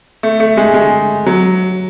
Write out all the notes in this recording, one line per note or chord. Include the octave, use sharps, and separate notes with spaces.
A3
A3
G#3
G#3
F#3